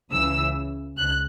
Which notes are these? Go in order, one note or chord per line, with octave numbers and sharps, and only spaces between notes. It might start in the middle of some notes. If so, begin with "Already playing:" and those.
C#2 C#3 E3 E6
C#2 F#6